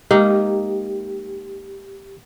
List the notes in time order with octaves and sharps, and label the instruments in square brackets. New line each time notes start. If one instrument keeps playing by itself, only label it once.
[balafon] G#3 [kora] A#3 D#4 [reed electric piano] G4